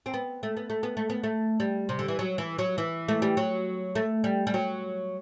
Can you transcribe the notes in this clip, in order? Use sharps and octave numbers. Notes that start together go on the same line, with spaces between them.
C4
B3
A3
B3
A3
B3
A3
B3
A3
G3
C3
D3
E3
F#3
E3
F#3
E3
A3
G3
F#3
A3
G3
G3
F#3